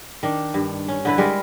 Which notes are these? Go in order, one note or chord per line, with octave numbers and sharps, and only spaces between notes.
D#3 D4
G2
C#4
D3 E4 B4
G3 G#3 A#4